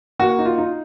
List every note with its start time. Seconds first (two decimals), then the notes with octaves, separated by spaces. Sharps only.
0.19 A#3 F#4
0.39 D#4
0.46 F4
0.58 D#4